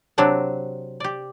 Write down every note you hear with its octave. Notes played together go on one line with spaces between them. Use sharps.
C3 F#3 C4 D4 F#4
G4 D5